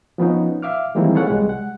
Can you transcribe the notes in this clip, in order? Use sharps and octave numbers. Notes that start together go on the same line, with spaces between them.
F3 B3 C#4 D#4
E5 F5 D6 F6
D#3 E3 G3 G#3 A#3 C4
G#4 A4 B4 C#5 F5 F#5
C2 G3 G#3
F#5